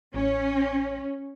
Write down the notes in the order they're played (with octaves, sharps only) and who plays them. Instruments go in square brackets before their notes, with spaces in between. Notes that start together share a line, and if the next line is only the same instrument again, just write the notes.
[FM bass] A1 [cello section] C#4